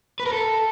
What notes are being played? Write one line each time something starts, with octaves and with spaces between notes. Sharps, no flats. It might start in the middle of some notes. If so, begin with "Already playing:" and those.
B4
A#4
A4